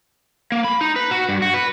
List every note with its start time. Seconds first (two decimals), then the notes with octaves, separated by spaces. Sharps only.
0.52 A#3
0.64 B5
0.81 D#4
0.96 B4
1.11 F#4
1.29 G2
1.42 F#4
1.54 B4